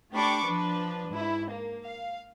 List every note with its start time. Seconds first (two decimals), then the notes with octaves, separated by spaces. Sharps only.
0.13 A3 D4 G4 B5 C#6 D6
0.46 F3 D4 B4
1.11 G#2 E4
1.50 A#3
1.84 F5